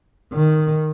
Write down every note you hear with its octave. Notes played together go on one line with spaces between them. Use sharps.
D#3